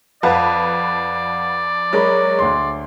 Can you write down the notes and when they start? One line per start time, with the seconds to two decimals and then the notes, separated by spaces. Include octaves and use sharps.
0.23 F2 B4 D5 F5 F#5 A5
1.93 F#3 G#3 A#4 B5 D6
2.39 D2 C6